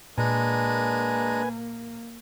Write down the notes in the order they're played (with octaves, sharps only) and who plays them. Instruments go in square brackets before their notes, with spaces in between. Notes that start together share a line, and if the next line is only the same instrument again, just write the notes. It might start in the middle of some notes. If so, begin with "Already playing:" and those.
[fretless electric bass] A#2 [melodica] G#3 D4 A#5 [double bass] A#3 [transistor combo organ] B4 G#5